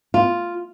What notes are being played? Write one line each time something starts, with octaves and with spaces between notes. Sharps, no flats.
F4